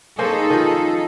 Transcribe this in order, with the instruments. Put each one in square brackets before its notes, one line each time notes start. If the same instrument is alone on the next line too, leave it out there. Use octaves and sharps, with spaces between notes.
[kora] A#3 C#4 C5 [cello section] D#4 G#4 A4
[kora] D#3 F3